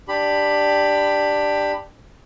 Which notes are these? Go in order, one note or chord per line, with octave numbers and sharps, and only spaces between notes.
D4 G4 B5